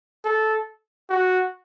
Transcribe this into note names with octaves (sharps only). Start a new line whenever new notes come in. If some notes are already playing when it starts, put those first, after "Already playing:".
A4
F#4